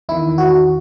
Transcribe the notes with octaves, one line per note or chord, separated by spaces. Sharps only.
E2 D#3 E4
F#4